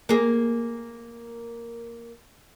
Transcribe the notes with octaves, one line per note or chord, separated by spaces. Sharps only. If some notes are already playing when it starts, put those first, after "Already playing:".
A#3 G#4